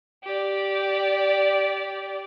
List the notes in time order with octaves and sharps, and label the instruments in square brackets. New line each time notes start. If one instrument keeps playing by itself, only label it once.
[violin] G4 D5